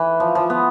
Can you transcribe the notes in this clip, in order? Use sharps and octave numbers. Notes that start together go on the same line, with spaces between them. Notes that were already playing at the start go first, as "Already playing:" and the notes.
Already playing: E3
F3
F3
B3